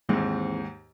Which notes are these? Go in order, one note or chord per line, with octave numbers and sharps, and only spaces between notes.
D#2 G#2 E3 G#3 C4